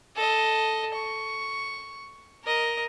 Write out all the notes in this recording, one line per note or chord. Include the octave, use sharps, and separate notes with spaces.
A4 D#5
C#6
A#4 D#5